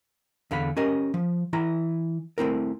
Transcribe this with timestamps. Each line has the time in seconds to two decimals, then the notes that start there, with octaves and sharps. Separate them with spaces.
0.51 E2 D3 F5 B5
0.77 C#4 G4 A#4 D#5
1.14 F3
1.53 E3 E4 A#5
2.38 A3 C4 E4 A#4